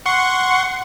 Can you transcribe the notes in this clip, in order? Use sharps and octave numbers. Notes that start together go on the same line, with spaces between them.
F#5 C6 C#6